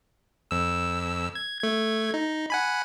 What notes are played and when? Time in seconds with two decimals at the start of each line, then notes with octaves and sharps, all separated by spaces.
0.51 F2 E6
1.35 G#6
1.60 A3 G#6
2.14 D#4
2.50 F#5 G#5 B5